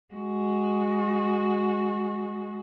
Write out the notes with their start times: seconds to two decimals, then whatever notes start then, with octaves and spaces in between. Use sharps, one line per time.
0.14 G#3 F#4